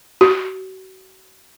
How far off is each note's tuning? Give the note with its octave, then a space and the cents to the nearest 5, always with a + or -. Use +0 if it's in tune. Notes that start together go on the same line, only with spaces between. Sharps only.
F#4 +35